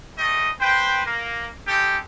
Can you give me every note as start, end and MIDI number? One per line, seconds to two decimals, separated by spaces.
0.18 0.50 55
0.18 0.50 57
0.18 0.50 75
0.61 1.01 71
0.61 1.01 72
0.61 1.01 79
1.06 1.47 58
1.06 1.47 70
1.68 1.99 56
1.68 1.99 67
1.68 1.99 69
1.68 1.99 79